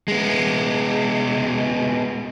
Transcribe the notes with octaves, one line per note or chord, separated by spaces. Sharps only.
G#3 B3